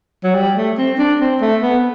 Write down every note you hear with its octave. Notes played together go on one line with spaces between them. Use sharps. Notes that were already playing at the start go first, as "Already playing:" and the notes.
F#3
G3
A3
C4
D4
C4
A3
B3